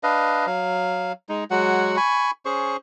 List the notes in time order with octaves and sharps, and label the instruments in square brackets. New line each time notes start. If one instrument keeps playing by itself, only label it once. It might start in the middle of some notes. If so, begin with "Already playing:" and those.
[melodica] D4 B4 D#5 F5
F#3 F5
G#3 D#4
F#3 G#3 F#4 F#5
G#5 B5 C#6
C#4 G#4 C5 C#6